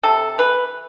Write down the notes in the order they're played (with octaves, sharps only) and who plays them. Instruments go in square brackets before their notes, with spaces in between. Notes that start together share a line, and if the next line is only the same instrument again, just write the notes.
[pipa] C3 A4
E3 B4